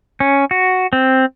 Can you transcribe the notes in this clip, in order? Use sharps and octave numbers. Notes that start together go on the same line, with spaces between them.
C#4
F#4
C4